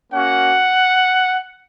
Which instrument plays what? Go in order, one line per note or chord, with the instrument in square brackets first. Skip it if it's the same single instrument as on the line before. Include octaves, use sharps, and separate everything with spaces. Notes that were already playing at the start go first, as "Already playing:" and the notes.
[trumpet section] A#3 C#4 F#4 F#5